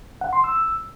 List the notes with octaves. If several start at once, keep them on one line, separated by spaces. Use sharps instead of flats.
F#5
C6
E6